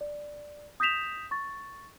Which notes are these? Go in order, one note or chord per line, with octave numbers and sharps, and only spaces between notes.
D5
D#6 G6 A#6 B6 E7 F7
C#6 A6